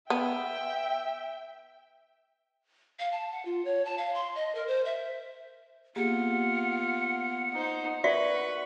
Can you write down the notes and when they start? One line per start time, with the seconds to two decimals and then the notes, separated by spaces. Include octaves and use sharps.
0.10 B3 E5 G5
2.99 F5
3.12 A5
3.32 F#5
3.45 F4
3.65 C#5
3.85 A5
3.98 F5
4.14 C6
4.35 D#5
4.55 A#4
4.67 C5
4.85 E5
5.96 A#3 B3 F4 G4 G#4 F#5
7.51 D#4 C5
8.04 F#4 A#4 B4 D5 E5 C#6